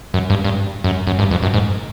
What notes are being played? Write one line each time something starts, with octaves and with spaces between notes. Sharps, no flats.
F#2
G2
G2
F#2
F#2
G2
F2
F#2
G#2